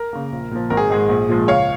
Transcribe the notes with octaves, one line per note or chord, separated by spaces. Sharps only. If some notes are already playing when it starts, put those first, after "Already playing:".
Already playing: A#4
C#3 A#3
A#1
A#2 F3
G#1 A#4
G#4
G#2 G#3 G#4
A#1
A#2 F3 G#3
C#2 C#5 F5